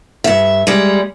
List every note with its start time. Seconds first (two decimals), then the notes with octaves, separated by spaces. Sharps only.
0.24 G2 E5
0.67 G3 G#3